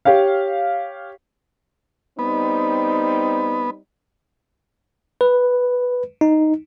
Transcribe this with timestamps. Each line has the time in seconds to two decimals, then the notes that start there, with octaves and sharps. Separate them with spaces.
0.05 G4 C#5 F5
2.19 G3 B3 C4 D#4
5.21 B4
6.21 D#4